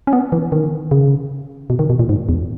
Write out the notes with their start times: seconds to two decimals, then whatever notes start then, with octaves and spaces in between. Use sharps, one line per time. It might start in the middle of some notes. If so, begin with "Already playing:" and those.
0.07 C#4
0.13 B3
0.32 E3
0.52 D#3
0.91 C#3
1.70 B2
1.79 D#3
1.90 B2
1.99 A#2
2.09 G#2
2.29 E2